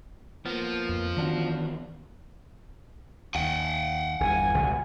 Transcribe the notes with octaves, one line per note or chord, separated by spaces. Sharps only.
F3 A#3 B3
F2
D#3 E3 B3 C#4 D4 F#4
D#2 F#5 G5
G1 E2 G2 G#5
G1 C#2 B2